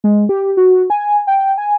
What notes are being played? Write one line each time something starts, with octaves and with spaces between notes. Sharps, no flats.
G#3
G4
F#4
G#5
G5
G#5